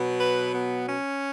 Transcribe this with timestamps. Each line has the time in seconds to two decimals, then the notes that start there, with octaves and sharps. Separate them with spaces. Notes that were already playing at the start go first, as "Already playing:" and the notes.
Already playing: B2 F#3 B3
0.20 B4
0.55 B3
0.89 C#4